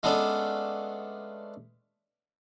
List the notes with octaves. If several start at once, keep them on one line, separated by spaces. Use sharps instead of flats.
G#3 A3 B3 C#4 D4 A4